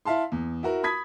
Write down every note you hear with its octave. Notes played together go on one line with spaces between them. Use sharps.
E4 E5 F5 A5 C6
E2
E4 F#4 A#4
B5 D#6 G#6 B6